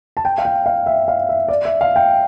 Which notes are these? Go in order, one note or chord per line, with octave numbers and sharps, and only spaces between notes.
A5
G5
F5
G5
F5
E5
F5
E5
D5
E5
F5
G5